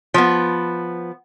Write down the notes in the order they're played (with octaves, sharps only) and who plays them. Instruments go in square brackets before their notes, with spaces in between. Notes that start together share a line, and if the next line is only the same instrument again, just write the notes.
[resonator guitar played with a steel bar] F3 B3